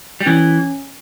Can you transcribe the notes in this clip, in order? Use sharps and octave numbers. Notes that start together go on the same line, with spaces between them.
G3
E3 C#4